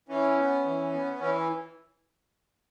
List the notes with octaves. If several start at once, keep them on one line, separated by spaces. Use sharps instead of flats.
E3 C#4
B3
E3
B3
E3 C#4